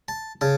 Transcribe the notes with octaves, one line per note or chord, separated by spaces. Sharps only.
A5
C#3 A5